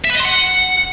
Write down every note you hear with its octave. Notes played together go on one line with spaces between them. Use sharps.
E5
B4
D#5
C6
F#5